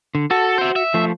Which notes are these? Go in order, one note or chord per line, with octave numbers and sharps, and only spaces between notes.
D3
F#4 A4
C5 E5
E5
F3 A3